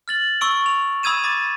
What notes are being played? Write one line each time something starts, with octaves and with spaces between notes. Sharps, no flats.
F6 A6 F#7
C#6 E6 D7
F7
B5 D#6 E6 G#6 D#7 E7
B5 D6 A6